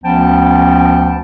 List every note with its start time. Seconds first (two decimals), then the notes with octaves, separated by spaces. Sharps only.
0.04 D2 F3 B3 C#4 G5 A5